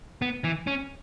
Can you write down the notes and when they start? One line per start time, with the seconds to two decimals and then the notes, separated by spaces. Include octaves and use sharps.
0.22 B3
0.44 E3
0.67 C#4